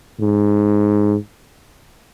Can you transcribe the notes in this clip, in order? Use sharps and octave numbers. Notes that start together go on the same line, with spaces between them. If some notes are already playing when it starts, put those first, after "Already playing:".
G#2